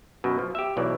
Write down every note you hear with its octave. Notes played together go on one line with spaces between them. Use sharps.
F#2 B2
F3
G4 E5
B1 B2 E3 D5